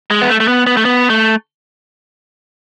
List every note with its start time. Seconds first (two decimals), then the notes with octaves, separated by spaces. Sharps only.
0.11 G#3
0.22 B3
0.30 A3
0.40 A3
0.48 B3
0.67 B3
0.77 A3
0.85 B3
1.10 A3